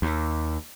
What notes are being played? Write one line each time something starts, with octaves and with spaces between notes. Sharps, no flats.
D#2